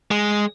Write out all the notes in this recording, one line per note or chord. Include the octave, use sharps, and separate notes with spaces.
G#3